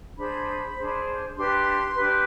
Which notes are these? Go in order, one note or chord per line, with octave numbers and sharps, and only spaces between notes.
D4 G#4 C5 B5
D4 G#4 C5
D4 G4 B4 C6
D4 G4 B4